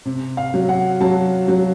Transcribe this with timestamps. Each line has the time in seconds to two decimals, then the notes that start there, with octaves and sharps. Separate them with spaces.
0.05 C3
0.37 F5
0.54 F#3
0.69 F#5
1.01 F#3 A5
1.48 F#3